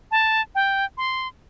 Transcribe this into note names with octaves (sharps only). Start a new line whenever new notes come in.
A5
G5
C6